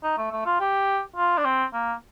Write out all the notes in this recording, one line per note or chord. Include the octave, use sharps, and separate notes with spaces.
D#4
A3
A3
F4
G4
F4
D4
C4
A#3